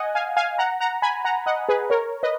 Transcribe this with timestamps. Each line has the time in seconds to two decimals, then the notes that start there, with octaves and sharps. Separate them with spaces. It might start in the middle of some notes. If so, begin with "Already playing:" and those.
Already playing: D#5 F#5 G#5
0.15 F5 G#5
0.37 F5 G#5
0.58 F#5 A#5
0.80 F#5 A#5
1.02 G#5 B5
1.25 F#5 A#5
1.46 D#5 F#5
1.69 G#4 B4
1.90 A#4 C#5
2.23 B4 D#5